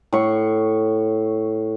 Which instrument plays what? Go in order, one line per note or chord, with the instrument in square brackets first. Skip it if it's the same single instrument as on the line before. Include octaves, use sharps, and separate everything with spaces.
[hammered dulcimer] A2 C#6